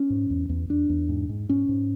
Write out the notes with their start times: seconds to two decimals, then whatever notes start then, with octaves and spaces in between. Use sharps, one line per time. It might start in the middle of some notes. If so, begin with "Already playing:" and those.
Already playing: C#4
0.10 G#2
0.30 E2
0.49 E2
0.69 E2 D4
0.89 E2
1.09 G#2
1.29 G#2
1.49 G#2 C#4
1.69 G#2